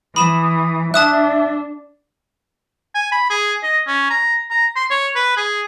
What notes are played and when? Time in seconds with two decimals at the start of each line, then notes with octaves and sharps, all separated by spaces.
0.16 E3 B5 D#6 E7
0.94 D4 E5 A5 D#6 F#6
2.95 G#5
3.12 B5
3.30 G#4
3.63 D#5
3.87 C#4
4.10 A#5
4.51 A#5
4.76 C6
4.90 C#5
5.16 B4
5.37 G#4